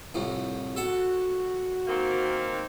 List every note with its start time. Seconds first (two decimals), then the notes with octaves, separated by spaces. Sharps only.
0.14 C2 F2 A2
0.76 F#4 A4 F#5 A5
1.88 D#3 A#3 C4